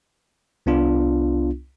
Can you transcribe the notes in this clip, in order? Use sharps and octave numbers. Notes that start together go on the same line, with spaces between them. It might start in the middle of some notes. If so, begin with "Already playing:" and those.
C2 B3 D4 F4